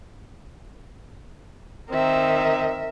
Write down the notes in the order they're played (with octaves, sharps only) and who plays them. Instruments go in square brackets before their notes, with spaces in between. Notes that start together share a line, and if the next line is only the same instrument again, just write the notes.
[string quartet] D#3 C4 [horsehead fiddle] A#4 E5